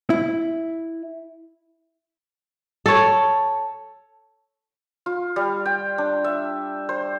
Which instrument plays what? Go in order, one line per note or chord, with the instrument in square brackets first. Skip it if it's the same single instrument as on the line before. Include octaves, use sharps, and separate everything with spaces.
[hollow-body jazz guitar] E4
[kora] A4 C#5
[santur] F4
G3
G5
D4
E5
C5